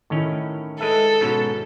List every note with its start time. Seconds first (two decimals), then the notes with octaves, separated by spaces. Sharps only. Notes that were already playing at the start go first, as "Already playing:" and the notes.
0.10 A2 D#3 C#4 E4 A#4
0.80 G#3 A4 B4 E5
1.21 G#2 B2 C#4